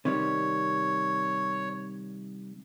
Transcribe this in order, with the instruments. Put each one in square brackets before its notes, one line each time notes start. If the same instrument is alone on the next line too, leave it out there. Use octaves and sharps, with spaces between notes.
[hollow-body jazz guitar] C3 D#3 G3 [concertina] C#5